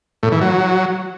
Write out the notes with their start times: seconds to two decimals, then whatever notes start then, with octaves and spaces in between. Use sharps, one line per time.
0.23 A2
0.32 E3
0.41 F#3